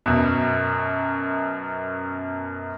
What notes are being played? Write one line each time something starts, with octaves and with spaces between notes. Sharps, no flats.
F#2 B2